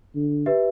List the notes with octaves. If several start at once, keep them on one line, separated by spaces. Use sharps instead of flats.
D3
G4 B4 E5